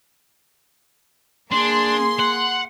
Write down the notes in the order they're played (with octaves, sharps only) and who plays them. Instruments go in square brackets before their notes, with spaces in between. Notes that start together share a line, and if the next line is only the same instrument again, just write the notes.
[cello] A#3 G#4 [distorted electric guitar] D4 [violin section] C6
[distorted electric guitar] F#5